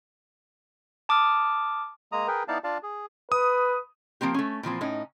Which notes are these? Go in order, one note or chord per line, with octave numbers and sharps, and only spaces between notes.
A5 D6 D#6 F6
G#3 A#3 A#5 D#6
G#4 A#4 B4 G5
B3 D#4 E4 D5 F5 A5
D4 F4 D5 F5 A5
G#4
B4 D#6
F3 A#3 C4 G4
A3 C#4
A#2 E3 F3 C4
A2 C#4 D#4